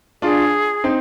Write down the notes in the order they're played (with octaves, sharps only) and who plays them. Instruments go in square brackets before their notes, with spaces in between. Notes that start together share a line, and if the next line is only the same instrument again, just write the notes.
[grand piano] D4 F4 [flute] G#4
[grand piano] C4 D#4